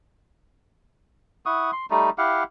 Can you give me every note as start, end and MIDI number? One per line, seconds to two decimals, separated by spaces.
1.46 1.71 64
1.46 1.71 78
1.46 1.71 85
1.46 1.71 87
1.72 1.86 84
1.90 2.10 55
1.90 2.10 57
1.90 2.10 63
2.18 2.44 64
2.18 2.44 67
2.18 2.44 77
2.18 2.44 78